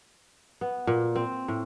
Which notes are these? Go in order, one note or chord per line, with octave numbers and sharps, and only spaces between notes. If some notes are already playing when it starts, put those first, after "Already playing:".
B3
A#2
C4
A2